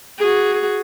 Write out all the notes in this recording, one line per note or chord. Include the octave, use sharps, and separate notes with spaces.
F#4 G#4